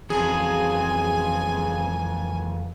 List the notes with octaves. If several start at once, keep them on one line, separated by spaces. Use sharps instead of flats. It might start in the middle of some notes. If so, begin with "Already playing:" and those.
F2 C#3 E3 F#3 G#4 G#5